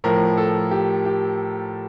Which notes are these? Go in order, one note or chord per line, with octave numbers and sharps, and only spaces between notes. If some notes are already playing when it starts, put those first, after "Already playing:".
A2 F3 A#4
A4
G4
G4